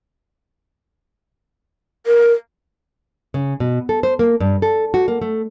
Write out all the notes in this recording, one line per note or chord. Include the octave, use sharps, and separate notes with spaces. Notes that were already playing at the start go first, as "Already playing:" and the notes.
A#4
C#3
B2
A4
C5
A#3
G2
A4
F#4
A#3
A3